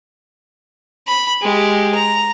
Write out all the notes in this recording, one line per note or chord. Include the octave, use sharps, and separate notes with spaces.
B5
G#3 G4
A#5